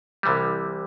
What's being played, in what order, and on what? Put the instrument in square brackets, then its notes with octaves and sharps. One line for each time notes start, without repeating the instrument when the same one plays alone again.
[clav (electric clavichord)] C2 C3 E3 G3